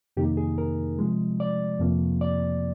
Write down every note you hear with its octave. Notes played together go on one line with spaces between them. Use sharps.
F2 C3 D#3 A#3 D#4 G4
G#4
A#4
C3 F3 G#3
D5
F2 C3 F3 A#3
D5